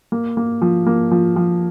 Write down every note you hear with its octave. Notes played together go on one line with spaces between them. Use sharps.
A#3
A#3
F3
A#3
F3
F3